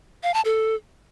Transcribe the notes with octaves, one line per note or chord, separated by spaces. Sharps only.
F5
A5
A4